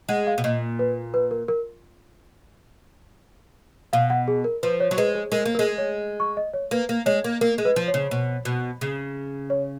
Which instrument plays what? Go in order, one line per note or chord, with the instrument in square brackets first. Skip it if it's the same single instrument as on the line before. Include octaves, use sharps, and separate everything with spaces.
[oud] G#3 [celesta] F#5
[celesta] F5
[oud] B2
[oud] A#2 [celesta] D#5
[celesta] B4
B4
A#4
A#4
[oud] B2 [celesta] F5
[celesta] F#5
G#4
A#4
[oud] F3 [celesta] B4
[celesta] C#5
[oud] F#3
[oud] G#3 [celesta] B4
[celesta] G#4
[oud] G#3 [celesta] A#4
[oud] A#3
[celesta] A#4
[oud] G#3
[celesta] C#5
C#6
D#5
C#5
[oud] A#3 [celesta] B4
[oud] A#3
[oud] G#3 [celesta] C#5
[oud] A#3
[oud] A#3 [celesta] A#4
[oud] G#3
[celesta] B4
[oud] F3
[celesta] C#5
[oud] C#3
B2
B2
C#3
[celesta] C#5